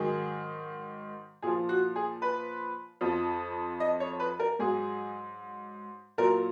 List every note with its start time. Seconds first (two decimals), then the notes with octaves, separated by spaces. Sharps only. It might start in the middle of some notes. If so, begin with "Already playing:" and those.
Already playing: G#2 D#3 F#3 G#4
1.42 A#2 F3 G#4
1.69 F#4
1.96 G#4
2.22 B4
3.01 F2 F3
3.80 D#5
4.00 C#5
4.20 B4
4.39 A#4
4.59 G#2 F#3 G#4
6.18 A#2 F#3 A#4